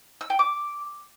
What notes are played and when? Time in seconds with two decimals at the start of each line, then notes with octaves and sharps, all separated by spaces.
0.21 E6
0.30 G5
0.39 D6